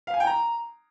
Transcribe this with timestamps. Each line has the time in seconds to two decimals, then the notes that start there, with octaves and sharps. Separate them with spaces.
0.07 F5
0.14 G#5
0.20 G5
0.27 A#5